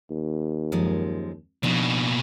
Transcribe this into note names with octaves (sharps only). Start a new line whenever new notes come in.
D#2
F#2 F3 G#3
B2 F3 A#3 D4 D#4